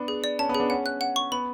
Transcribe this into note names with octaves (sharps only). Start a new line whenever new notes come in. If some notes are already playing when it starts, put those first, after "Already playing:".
Already playing: B3 D4
G#4
D5
C#4 A5
B3
G#4
B3 D4
C#4 F#5
F#6
F#5
C#6
B3 B5